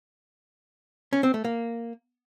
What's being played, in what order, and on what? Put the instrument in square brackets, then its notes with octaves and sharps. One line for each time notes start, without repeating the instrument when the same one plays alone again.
[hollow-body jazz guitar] C#4
C4
A3
A#3